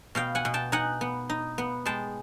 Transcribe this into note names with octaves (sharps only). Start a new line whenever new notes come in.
B2 F5 G5
F#5 G#5
B2
G5 A5
D#4 F#5 G#5
B3
D#4
B3
G#3 G5 A5